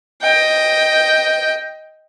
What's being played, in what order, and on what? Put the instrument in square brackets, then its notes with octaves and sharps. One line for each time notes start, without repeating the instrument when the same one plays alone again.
[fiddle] D#5 G5